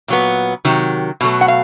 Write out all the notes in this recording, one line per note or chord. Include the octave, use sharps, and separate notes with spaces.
A#2 F#3 B3
C3 D#3 F#3
B2 F#3 A3
F#5
F5